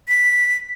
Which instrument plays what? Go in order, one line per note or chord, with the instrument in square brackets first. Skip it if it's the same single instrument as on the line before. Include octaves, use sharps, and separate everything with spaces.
[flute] B6